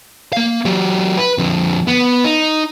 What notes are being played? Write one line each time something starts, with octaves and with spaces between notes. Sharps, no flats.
A#3 F5
F#3 G4
B4
F2 D3
B3
D#4